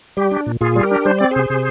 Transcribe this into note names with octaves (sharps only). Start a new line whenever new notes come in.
G3 G4
D4
A#2
A#2 F4 G#4
G3
G4 A#4
D4
G3 C5
C4 D5
C3 G#4 C5
C3